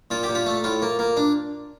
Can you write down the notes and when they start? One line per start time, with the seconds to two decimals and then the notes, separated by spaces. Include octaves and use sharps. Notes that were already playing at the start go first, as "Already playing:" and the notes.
0.11 A#2 F4
0.23 G4
0.29 A#2
0.35 F4
0.46 A3
0.64 A2 F4
0.82 A#3
0.99 A#3
1.17 D4